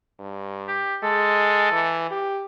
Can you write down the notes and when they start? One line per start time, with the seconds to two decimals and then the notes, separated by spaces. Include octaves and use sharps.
0.20 G2
0.68 G4
1.03 G#3 A4
1.72 E3
2.11 G4